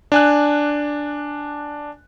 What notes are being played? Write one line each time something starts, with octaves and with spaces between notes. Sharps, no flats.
D4 G#5 F#6